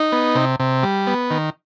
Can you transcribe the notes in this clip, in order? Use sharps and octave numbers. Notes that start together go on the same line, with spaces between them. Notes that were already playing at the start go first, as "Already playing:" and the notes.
Already playing: D#4
B3
C3
C3
G3
B3
D#3